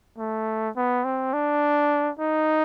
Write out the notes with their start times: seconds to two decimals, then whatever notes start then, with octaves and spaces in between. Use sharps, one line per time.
0.18 A3
0.77 B3
1.05 C4
1.34 D4
2.19 D#4